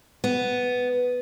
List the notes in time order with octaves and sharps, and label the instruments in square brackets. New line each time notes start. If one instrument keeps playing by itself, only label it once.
[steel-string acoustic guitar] B3